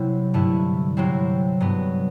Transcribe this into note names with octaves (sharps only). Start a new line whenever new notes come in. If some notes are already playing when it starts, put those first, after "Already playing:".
Already playing: C3 F#3 C4 E4
G2 D3 A3 E4
C3 F#3 C4 E4
G2 F#3 B3